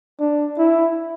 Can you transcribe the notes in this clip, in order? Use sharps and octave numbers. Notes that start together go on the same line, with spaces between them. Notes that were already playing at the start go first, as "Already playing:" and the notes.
D4
E4